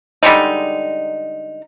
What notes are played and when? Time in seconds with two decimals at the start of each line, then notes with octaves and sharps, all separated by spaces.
0.23 D3 G3 G#3 D#4